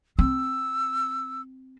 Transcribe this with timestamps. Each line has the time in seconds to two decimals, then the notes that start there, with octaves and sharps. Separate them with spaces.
0.19 C4 E6